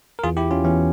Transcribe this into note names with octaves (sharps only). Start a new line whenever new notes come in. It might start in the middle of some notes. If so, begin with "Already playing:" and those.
A#4
E2 E3 F4 G#4
E4 G4
C#4 F4
E2 E3 C#4